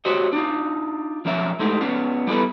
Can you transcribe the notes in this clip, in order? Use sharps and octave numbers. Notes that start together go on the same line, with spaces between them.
F#4 G4 C5 C#5 D#5
D4 D#4 F4
B1 F3 C#4 A#4 E5
G#3 A3 D#4 G4
B3 C#4 F4
G3 B3 E4 A4 B4